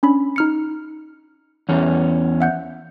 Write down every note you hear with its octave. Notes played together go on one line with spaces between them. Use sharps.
C#4 D4 B5
D#4 F6 C#7
E2 C#4
E5 F#5 G6